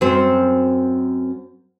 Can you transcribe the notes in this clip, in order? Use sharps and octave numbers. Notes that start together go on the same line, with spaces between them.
F#2 C4